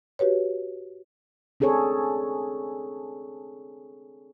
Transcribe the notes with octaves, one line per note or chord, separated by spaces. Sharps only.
F#4 G4 B4 C#5
C4 D4 G#4 A4 C#5